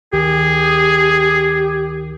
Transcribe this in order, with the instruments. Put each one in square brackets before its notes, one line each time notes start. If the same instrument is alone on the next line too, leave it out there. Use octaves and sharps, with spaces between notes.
[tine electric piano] D2 D#3 A#4 [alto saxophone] G4 [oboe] G#4